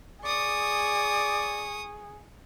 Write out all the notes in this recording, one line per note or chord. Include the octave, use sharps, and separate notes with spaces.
G#4 D5 C#6 D#6